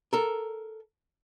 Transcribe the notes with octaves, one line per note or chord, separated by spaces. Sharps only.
A4 A#4